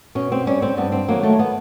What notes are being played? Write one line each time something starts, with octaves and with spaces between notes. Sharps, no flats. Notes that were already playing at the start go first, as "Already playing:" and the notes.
B2 C#4
C4
G3 C#4
C4
G2 B3
C4
D#3 F#3 A#3
A3
B3